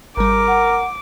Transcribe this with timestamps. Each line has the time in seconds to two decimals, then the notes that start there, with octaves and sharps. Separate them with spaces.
0.17 G#1 G3 A#4 D6
0.48 F#5